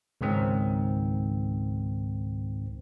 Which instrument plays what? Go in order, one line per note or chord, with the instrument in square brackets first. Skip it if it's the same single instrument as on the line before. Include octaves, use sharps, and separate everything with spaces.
[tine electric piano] C#2 G#2 D#3 C4